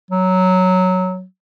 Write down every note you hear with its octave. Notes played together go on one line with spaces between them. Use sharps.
F#3